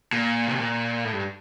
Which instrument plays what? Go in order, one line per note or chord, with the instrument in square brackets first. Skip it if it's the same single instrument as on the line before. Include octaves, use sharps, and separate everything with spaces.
[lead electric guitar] A#2
C3
A#2
A2
G2